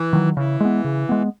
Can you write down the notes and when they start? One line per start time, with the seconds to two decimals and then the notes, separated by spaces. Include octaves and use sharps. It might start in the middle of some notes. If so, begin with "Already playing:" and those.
Already playing: E3
0.13 D#3 F#3
0.36 C#3 E3
0.60 G#3 B3
0.84 C#3
1.09 G#3 B3